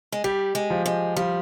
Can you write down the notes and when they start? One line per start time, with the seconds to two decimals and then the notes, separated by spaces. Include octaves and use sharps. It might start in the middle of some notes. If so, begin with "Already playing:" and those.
0.12 G#3
0.24 G3 G4
0.55 G#3
0.70 F3
0.86 G#3
1.16 F3 G3